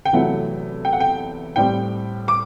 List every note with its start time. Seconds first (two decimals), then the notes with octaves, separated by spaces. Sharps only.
0.05 G5
0.13 E2 C3 F#3 A3 E4 F#5
0.85 G5
0.93 F#5
1.00 G5
1.56 A2 G3 C4 G5
2.28 D6